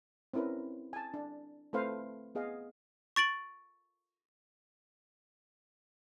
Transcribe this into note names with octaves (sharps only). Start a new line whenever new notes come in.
C4 C#4 E4 A#4 B4
G#5 A5
D4
A3 C4 A4 B4 C5 F5
B3 G#4 D#5 F5
C#6 A6 D7 F#7